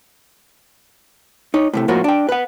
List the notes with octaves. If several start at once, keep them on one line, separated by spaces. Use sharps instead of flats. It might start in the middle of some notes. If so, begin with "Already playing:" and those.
D#4 C#5
A2 C3 A3
A2 F3 A#3 F4 F#4
D4 G5
B4 F#5